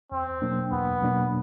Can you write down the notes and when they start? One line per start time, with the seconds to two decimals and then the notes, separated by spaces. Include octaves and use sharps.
0.12 E2 C4
0.42 B2 F#3 A#3 D4
0.72 E2 B3
1.02 B2 F#3 A#3 D4